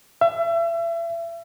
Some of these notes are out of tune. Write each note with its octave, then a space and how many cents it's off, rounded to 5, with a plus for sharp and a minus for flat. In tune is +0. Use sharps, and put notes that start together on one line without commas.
E5 +35